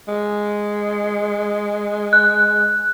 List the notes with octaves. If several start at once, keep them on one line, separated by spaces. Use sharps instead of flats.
G#3
F#6